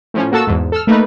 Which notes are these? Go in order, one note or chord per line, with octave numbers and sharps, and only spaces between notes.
A2 F3 C#4
A#3 F#4 A4 A5 E6
E2 G#2
A4 E6 F6
A3 A#3 D#4 B4